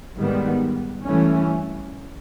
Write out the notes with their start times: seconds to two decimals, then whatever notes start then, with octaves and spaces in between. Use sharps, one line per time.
0.17 G#2 D#3 G3 B3
1.06 G2 E3 A3 C#4